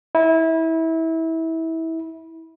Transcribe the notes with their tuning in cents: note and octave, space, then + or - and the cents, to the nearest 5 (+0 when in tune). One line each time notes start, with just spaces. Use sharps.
E4 -25